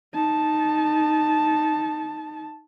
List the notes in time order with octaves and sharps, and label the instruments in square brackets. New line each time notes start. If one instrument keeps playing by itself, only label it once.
[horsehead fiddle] D#4 A5